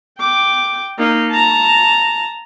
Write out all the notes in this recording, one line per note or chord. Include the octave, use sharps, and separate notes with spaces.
G5 D6
A#3 D#4
A5 A#5